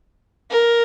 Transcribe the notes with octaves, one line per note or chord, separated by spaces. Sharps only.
A#4